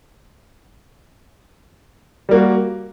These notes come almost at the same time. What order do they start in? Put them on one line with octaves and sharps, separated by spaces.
G3 A#3 F#4